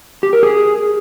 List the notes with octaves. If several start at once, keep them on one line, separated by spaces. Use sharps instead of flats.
G4
A#4
G#4